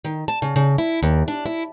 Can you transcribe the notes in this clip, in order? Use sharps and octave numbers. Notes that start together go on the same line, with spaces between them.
D#3
A5
C#3
C#3
E4
D#2
D4
E4